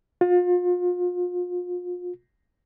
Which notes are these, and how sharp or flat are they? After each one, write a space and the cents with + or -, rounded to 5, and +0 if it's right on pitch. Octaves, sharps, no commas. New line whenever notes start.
F4 +35